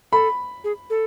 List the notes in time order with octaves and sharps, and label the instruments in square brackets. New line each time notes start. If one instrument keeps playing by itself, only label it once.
[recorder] A4 [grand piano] B5
[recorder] G#4
A4